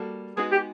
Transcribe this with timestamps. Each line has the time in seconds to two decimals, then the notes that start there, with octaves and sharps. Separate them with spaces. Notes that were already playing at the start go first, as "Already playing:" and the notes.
Already playing: G3 A#3 F#4 A4
0.37 G#3 B3 D#4 F#4 G#4
0.52 G4